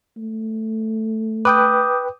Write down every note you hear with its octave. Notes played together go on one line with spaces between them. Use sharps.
A3
B4 G5 D6 D#6 G6